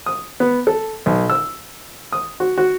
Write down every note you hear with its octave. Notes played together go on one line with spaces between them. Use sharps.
D#6
B3
A4
B1
E6
D#6
F#4
F#4